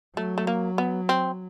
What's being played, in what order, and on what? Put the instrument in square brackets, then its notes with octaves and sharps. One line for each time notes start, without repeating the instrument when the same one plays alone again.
[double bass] F#3 [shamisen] A3
[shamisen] A3
A#3
B3
C4